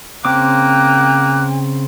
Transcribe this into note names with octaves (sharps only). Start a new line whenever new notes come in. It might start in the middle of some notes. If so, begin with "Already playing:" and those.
C#3 A#3 C4 G5 D6 F#6